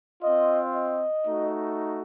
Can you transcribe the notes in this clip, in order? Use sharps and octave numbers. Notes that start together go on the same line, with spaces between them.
C4 F4 D#5
D#5
A3 D#4 F#4